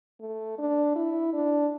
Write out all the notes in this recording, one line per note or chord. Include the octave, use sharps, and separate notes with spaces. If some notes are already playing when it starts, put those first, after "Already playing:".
A3
D4
E4
D4